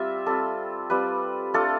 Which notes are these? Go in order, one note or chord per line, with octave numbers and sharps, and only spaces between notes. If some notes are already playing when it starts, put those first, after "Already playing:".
Already playing: G3 C4 F4 E5
G3 C4 F4 A4
G3 C4 F4 B4
A3 D4 F4 A4